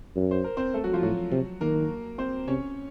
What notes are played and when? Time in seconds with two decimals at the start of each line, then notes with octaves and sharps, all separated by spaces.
0.16 F#2
0.31 C5
0.44 A#4
0.57 C4 C5
0.74 A3 A4
0.84 F#3 F#4
0.93 F3 F4
1.03 A2 F#3 F#4
1.31 C3
1.61 D#3 A#3 A#4
2.18 C4 C5
2.48 C3 C#4 C#5